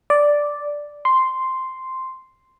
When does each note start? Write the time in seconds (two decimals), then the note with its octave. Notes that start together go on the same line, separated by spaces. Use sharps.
0.10 D5
1.05 C6